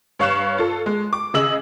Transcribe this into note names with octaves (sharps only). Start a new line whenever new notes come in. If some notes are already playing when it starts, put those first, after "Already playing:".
G2 C#5 F5 C#6 F#6 E7
F4 A4
G#3
D6
C#3 G#4 D#5 E6 F#7